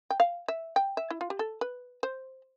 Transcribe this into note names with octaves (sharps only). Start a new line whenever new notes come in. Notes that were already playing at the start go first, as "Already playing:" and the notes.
G5
F5
E5
G5
E5
E4
F4
G4
A4
B4
C5